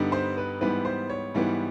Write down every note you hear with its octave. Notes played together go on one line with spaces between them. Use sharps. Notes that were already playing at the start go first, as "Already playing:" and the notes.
Already playing: G2 D3 G3 B3 D#4
C5
B4
G#2 E3 G3 B3 B4
C5
C#5
G#2 E3 G3 B3